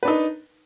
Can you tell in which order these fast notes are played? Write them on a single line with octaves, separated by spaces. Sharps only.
B4 D4 D#4